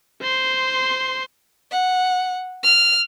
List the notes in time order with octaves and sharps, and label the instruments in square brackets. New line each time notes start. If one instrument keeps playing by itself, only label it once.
[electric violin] C5 C6
[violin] F#5
F6